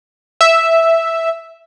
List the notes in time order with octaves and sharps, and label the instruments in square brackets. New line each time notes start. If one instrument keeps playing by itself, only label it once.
[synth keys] E5